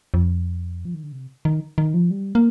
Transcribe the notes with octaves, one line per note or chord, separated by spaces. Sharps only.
F2
F3
D#3
D3
C3
D#3
D#3
F3
G3
A#3